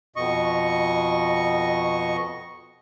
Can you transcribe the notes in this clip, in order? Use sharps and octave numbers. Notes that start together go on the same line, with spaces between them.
F2 B2 D#5 C#6